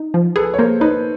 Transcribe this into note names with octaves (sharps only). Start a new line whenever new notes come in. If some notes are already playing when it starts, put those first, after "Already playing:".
Already playing: D#4
F3
G#4 A4 B4
C#5
A#3 A#4 C5
D#4 B4 C#5